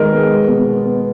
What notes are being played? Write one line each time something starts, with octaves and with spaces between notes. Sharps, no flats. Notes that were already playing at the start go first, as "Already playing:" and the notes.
Already playing: D#3 G#3 B3 A#4 D#5
B3 G#4
G#3
B2
B3
B3